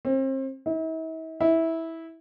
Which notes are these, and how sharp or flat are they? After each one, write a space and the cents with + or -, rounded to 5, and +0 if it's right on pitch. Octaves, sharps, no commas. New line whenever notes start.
C4 +35
E4 -45
E4 -15